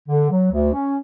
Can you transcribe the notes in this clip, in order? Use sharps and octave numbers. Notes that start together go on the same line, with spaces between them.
D3
F#3
D2
C#4